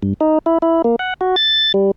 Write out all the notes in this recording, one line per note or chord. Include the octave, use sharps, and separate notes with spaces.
G2
D#4
E4
E4
A#3
F#5
F#4
A6
G3